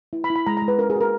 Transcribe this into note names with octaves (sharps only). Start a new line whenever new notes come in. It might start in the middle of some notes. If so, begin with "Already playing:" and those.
E4
B5
E4
B5
G#3 A#5
A#5
G#3
B4
C#4 A#4
G#4
F#4 A#4